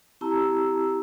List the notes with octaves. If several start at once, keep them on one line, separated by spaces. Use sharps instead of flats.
C4 E4 G4 A5 A#5 E6